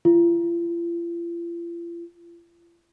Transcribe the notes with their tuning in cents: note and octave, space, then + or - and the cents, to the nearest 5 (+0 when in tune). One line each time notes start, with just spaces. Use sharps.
F4 -45